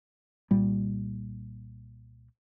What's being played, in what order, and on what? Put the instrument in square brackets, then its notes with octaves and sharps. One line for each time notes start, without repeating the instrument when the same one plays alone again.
[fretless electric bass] C2 A#2 G3